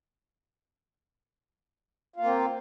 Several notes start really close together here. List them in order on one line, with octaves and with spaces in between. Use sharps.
F4 A#3 C4